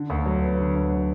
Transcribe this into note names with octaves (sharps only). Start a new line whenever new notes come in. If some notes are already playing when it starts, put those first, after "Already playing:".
Already playing: D3
D2
F#3
B3
D3
D2
F#3